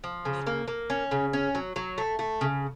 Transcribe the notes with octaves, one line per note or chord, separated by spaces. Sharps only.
F3
C#3
A#3
A#3
C#4
C#3
C#4
F#3
F#3
A3
A3
C#3